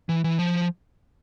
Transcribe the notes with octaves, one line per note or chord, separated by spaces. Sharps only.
E3
E3
F3